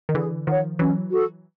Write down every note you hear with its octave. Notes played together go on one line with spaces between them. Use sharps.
D#3
D3 E3 G#4
D#3 F3 C#5 F#5
E3 F#3 C#4
F#4 A4